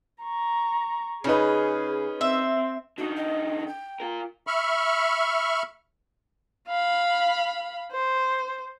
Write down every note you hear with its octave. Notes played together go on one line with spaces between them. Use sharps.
A#5 C#6
C#3 C#4 D#4 G#4 B4
C4 E5
D3 D#4 F#4
D#5
G5
F4 A#4
E5 B5 C#6 F6
F5 B5
C5